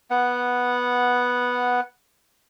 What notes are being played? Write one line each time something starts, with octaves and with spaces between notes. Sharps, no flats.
B3 F#5